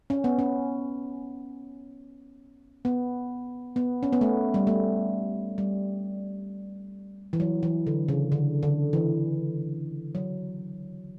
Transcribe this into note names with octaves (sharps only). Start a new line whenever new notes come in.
C#4
B3
C#4
B3
B3
C#4
B3
A3
G3
A3
G3
E3
F#3
E3
D3
C#3
D3
D3
E3
F#3